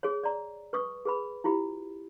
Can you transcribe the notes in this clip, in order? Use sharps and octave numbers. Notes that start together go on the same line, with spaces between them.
G#4 C#5
D5 A#5
B4 C#6 D#6
G#4 B4 B5
E4 F4 G4 B5